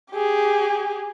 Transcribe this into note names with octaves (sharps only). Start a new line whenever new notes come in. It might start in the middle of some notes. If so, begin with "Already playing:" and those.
G4 G#4